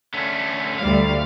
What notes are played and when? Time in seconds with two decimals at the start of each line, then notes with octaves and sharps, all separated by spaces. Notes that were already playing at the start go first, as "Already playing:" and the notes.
0.14 D3 A3 C#4
0.79 D2 G3 F5